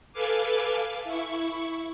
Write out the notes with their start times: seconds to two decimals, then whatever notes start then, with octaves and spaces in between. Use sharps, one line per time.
0.13 A4 B4 F5 G#5 D6
1.04 E4 C#6